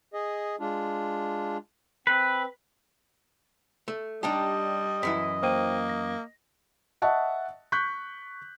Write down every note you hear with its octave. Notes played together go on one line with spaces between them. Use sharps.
G#4 D#5
G#3 D4 F4
C4 B4
A3
G3 D4 D#4 G4 D#5 A5
F#2 E3 E4 B6
A#3 C5 G5 D#7
A#6
D#5 E5 F#5 A5 C#6
C#6 F#6 G6 B6